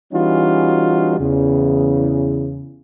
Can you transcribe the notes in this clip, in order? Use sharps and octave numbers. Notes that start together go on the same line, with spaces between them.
E3 G3 C#4 D#4 F4 F#4
E2 C#3